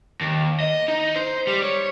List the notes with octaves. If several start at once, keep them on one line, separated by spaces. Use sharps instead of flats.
D#2
D#5
D#4
C5
G3
C#5